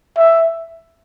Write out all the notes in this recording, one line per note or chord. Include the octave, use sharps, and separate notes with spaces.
E5